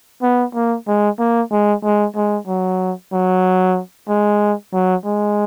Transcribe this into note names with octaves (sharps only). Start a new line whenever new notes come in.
B3
A#3
G#3
A#3
G#3
G#3
G#3
F#3
F#3
G#3
F#3
G#3